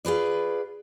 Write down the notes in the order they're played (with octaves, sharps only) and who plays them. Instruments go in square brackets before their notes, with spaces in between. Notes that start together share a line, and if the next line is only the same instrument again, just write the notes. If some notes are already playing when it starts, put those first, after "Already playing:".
[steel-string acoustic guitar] F4 G#4 B4 D5